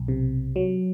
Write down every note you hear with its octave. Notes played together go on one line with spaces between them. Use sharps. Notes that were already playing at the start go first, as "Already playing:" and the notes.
Already playing: B1
C3
F#3